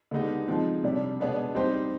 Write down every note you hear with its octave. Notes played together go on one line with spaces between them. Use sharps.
D3 G#3 B3 D#4 G4
F3 G#3 C4 D#4
C3 G3 D4 G4
B2 G#3 B3 D4 G#4
G3 C4 D#4 G4 C5